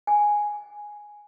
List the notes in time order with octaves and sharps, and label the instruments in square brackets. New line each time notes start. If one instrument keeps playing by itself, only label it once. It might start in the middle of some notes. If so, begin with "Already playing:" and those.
[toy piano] G#5